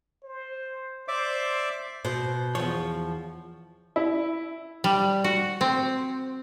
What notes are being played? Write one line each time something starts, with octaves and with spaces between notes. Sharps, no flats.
C5
C5 D5 E5 D6
B2 C5
E2 F3 C#5
E4
G3
F#4
C4